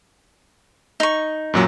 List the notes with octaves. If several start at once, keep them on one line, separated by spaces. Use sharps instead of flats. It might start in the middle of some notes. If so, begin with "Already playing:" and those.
D#4 C#6
F#2 A#2 F#3